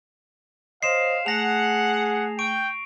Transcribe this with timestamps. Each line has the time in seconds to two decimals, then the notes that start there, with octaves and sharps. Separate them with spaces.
0.83 C5 C#5 D#5 F5 C6 C7 E7
1.26 A3 G#4 F#5 A#6 F7
2.39 G5 C#6 D7